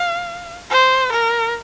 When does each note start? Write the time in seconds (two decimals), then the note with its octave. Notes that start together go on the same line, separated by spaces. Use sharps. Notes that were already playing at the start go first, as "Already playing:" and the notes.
Already playing: F5
0.70 C5
1.12 A#4